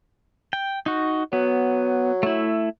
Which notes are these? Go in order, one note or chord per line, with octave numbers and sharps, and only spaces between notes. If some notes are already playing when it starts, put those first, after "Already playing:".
G5
D#4 F#4
F#3 B3
A3 E4